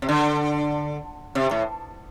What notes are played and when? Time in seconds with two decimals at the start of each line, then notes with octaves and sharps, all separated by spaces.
0.02 C3
0.09 D3
1.35 C3
1.51 A2